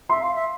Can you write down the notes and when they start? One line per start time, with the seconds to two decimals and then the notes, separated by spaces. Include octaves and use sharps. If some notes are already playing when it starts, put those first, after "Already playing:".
0.09 E5 C6
0.22 F5
0.35 E5